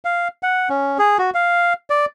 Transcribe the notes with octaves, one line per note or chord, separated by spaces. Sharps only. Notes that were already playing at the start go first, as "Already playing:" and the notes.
F5
F#5
C#4
G#4
F#4
F5
D5